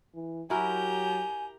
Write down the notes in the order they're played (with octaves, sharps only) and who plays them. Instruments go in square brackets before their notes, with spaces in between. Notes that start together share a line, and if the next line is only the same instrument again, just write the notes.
[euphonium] E3
[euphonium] F#3 [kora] E4 F#4 A#4 [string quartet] G4 A#5 G6 [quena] G#5